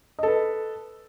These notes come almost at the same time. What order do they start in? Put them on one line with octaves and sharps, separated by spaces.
D#5 A4 B4